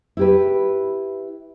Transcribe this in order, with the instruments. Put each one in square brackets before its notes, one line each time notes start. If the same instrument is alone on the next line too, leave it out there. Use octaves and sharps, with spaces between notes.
[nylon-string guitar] E4 G4 B4